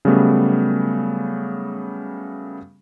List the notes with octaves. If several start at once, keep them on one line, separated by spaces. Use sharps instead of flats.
C#3 F#3 G3 A3 B3